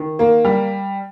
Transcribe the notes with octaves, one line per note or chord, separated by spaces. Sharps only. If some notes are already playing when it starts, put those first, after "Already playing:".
Already playing: D#3
A#3
G3